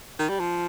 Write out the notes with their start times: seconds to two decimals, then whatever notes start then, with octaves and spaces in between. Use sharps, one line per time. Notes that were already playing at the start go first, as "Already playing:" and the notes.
0.19 D#3
0.29 G3
0.40 F3